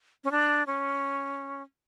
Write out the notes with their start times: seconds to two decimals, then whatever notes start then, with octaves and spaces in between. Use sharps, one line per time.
0.24 C#4
0.31 D4
0.67 C#4